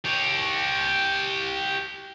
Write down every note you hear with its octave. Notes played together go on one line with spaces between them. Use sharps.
G4 C#5